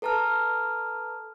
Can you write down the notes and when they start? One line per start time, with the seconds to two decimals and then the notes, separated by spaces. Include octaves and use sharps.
0.02 A4 B4 A5 A#5 F6